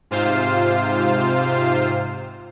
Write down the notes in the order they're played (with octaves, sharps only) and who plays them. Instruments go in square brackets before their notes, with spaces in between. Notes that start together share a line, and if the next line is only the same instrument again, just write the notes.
[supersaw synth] G#2 C3 F4 C5 F5